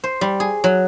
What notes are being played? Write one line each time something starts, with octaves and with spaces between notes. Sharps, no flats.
C5
G3
G#4
F#3